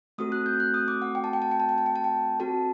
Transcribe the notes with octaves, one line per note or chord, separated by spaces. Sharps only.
A3 C4 F#4 A4 D#6
F#6
G6
F#6
D#6
D6
F#5
G5
A5
G5
A5
G5
A5
G5
A5
G5
A5
G5
C4 F#4 A4 A5